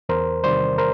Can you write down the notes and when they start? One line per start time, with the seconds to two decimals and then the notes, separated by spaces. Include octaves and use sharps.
0.09 E2 A#4 C5
0.44 C3 D#3 G3 C5 D5
0.78 A#4 C5